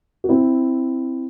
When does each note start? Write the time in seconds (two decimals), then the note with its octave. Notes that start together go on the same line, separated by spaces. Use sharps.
0.24 F#4
0.29 C4 E4